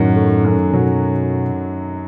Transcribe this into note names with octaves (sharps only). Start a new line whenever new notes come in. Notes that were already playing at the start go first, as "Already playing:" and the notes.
Already playing: F#2 A2 D#3 F#3
A3
F#2
B2 F#3